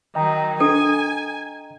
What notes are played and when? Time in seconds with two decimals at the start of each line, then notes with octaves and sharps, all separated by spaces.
0.15 D#3 F#3 D#5 G5 A#5
0.60 D4 A4 G#5